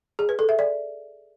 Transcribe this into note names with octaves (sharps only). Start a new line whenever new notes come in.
G#4
B4
A4
E5
D5